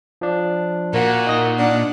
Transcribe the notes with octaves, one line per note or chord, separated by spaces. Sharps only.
F3 D4
A#2 A#3 F#4
D#4 D#5 A#6
D4 F#5